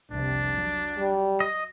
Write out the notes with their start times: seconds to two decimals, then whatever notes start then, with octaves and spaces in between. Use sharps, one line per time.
0.11 F1 C2 C3 D4
0.56 F#3
0.98 G3
1.40 D#5